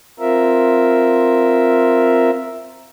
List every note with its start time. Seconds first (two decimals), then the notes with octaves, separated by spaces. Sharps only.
0.20 C4 F4 A#4 E5